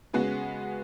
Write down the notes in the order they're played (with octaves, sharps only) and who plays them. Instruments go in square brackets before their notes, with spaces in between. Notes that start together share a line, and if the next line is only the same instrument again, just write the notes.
[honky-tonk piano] C#3 G#3 B3 F#4